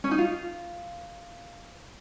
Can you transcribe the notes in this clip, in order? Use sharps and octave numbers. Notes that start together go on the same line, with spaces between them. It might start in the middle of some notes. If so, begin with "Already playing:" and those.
C#4
D#4
F4